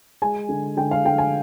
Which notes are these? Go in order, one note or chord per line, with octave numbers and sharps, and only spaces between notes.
G#3 G#5
D3
D3 G5
F5
D3 G5
G#5